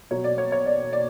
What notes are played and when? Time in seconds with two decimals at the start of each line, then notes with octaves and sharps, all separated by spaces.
0.11 B2 F#3 C#5
0.24 D5
0.38 C#5
0.52 C#5
0.66 D5
0.93 D5